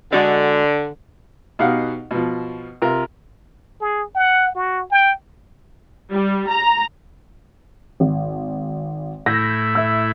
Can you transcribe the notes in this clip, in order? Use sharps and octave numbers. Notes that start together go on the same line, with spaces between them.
D3 G#3 F#4 D5
B2 D#4 G4 F5 F#5
B2 F3
C3 F4 A#4
G#4
F#5
F#4
G5
G3
A#5
G#1
A2 E4 G6 A#6
E5 E6